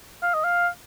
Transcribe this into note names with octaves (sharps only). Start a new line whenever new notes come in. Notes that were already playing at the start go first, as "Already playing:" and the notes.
F5
D#5
F5